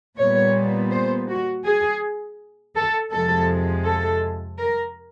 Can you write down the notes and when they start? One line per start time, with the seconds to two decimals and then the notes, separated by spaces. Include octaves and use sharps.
0.18 A#2 G3 B3 C#5
0.91 C5
1.28 F#4
1.65 G#4
2.76 A4
3.12 F2 C3 F3 G#3 A4
3.85 A4
4.58 A#4